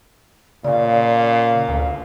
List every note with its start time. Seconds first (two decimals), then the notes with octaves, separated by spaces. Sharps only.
0.65 A#2 C#3 D5 F5
1.69 D2